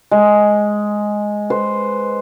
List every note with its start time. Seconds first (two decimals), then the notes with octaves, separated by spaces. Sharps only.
0.11 G#3
1.50 B4 C5